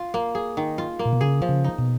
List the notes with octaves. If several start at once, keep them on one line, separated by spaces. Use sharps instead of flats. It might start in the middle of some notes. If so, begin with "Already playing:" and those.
Already playing: F4
A#3
G#4
D#3
F4
A#3
A#2
B2
C#3 G#4
F3
C#3
D#4
B2